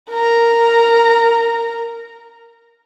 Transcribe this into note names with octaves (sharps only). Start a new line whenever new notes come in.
A#4 A#5